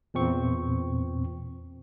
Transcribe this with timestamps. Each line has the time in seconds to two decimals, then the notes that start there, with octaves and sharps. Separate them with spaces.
0.14 E2 A#2 C4 C#6